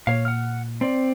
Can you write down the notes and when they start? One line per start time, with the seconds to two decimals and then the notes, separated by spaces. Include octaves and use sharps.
0.07 A#2 C#5 F5
0.25 F#5 F6
0.81 C4 D5